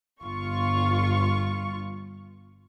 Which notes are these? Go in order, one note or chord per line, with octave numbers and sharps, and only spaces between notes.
G1 G2 F4 C#6